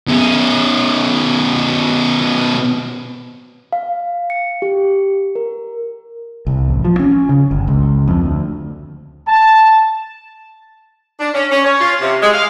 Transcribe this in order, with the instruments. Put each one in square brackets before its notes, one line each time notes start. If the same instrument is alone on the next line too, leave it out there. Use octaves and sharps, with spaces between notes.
[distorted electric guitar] B2 C#4
[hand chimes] F5
C#7
G4
A#4
[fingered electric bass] C2
A1
F3
C#4
C#3
G1
C#2
F2
D2
[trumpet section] A5
[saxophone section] D4
C#4
C#4
C#5
F4
C3
G#3
F5